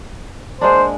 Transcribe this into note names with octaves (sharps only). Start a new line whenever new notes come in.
G#3 A#3 D4 C5